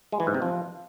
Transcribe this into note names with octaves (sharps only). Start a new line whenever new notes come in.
G#3
E3
G#2
C3
F3